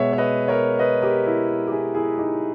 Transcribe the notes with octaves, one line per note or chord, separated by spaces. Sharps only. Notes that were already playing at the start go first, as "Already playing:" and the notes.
Already playing: B2 G#3 B3 C#5 E5
C#5
B4 D#5
A#4 C#5
B4 D#5
G4 A#4
E4
G4
E4 G#4
E4 G#4
D#4 G4